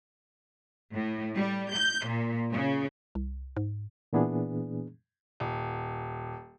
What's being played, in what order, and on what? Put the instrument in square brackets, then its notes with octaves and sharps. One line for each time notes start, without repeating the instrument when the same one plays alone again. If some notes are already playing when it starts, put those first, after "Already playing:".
[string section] A2
G3
G6
A#2
C#3
[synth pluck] C2
G#2
[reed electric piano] A#2 E3 B3 D4 G#4
[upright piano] D#1